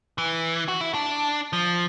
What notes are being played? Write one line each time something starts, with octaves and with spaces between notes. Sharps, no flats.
E3
F#4
E4
D4
F3